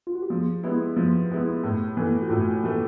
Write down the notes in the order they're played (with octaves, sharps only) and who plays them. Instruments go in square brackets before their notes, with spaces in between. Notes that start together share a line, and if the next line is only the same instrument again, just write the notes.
[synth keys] F4
F#4
G4
[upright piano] F3 [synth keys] G#4
[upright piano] G#3 B3 E4 [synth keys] G4
[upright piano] F3
G#3 B3 E4
A2
E3 A3
[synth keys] F#4
[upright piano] A2 [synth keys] F4
[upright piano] E3 A3 [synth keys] G4